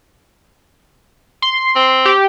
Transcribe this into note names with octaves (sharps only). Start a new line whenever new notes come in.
C6
C4
G4